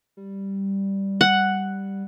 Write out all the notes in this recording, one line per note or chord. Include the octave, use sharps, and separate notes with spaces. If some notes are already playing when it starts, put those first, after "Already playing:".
G3
F#5